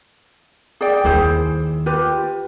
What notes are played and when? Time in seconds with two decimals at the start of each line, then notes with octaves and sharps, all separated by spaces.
0.81 G#4 D5 G5
1.04 D#2 E4 G#4 C5
1.86 F4 G4 B4